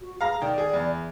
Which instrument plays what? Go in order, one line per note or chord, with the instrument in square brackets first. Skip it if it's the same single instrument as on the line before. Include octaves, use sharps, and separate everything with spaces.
[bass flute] F#4
[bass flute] G#4 [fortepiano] F5 A#5
[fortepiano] D#3 [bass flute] D5
[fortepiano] G#4
E2